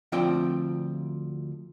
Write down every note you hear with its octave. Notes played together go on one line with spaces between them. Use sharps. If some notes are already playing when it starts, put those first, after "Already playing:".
D2 F3 C4 F4 D5 G5